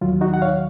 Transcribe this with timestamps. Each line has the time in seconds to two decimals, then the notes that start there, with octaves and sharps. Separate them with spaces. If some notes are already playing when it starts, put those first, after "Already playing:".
0.01 D#2 D#3 F#3 F4
0.21 D#4 F#4
0.34 F#5
0.42 C#5 F5